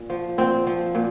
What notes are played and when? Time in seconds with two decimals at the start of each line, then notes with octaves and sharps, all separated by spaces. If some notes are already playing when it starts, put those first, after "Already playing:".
Already playing: A#2
0.10 F3
0.38 A#2 C4
0.67 F3
0.95 A#2